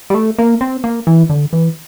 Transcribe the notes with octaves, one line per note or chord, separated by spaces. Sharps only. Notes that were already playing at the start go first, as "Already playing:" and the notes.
G3
A3
A#3
C4
A#3
E3
D3
E3